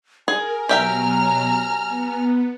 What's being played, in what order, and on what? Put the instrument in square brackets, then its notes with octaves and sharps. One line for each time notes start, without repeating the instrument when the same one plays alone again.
[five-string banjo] G#4 [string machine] A#4 [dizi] G#5
[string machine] B2 F#3 [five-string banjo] G4 E5 G5 [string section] A#5 F6
[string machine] B3